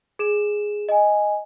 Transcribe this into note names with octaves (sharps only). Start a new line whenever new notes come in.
G#4 E7
D#5 G#5